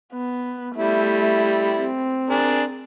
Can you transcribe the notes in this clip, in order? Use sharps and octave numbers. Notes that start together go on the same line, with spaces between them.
B3
G3 A3 E4
C4
D4 G#4 A#4